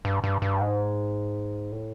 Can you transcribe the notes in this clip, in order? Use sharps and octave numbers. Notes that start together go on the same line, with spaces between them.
G2
G2
G2
G#2
A2